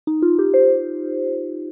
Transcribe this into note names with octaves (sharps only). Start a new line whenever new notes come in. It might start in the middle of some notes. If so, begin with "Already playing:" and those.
D#4
F4
G4
C5